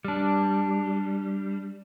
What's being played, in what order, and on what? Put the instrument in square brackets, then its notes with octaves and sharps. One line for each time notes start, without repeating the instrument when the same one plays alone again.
[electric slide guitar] G3 D4